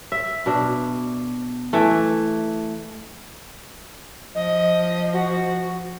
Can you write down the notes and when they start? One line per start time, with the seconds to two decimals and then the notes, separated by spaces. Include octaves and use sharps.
0.12 E5
0.46 B2 D4
1.73 E3 A3
4.35 F3 D#5
5.13 F#4